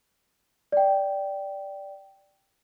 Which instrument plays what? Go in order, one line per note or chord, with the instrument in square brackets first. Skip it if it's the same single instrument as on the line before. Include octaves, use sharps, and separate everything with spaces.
[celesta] D5 G5